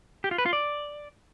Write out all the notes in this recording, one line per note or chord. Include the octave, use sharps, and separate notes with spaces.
G4
F4
B4
F4
D5